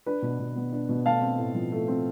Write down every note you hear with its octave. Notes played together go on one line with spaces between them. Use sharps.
D4 B4
B2
B2
B3
D4
B2
A3 F5 A5
C4
A2
F3
A3
C4